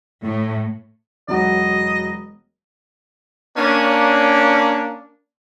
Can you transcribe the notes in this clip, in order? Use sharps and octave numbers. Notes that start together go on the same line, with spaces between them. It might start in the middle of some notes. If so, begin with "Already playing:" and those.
A2
E1 F#3 F#4 D#5
A#3 C#4 D4